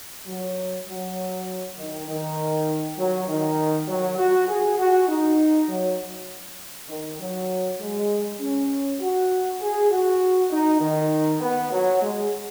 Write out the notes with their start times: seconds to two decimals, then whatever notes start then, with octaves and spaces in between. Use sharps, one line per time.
0.27 F#3
0.87 F#3
1.77 D#3
2.08 D#3
2.98 F#3
3.28 D#3
3.88 F#3
4.18 F#4
4.49 G#4
4.79 F#4
5.09 D#4
5.69 F#3
6.90 D#3
7.20 F#3
7.81 G#3
8.40 C#4
9.00 F#4
9.61 G#4
9.91 F#4
10.51 D#4
10.81 D#3
11.41 B3
11.72 F#3
12.02 G#3